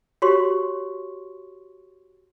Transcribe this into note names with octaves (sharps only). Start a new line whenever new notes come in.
F#4 G4 C#5 C6 C#6